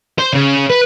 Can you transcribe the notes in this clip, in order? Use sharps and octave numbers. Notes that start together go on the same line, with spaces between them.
C5
C#3
B4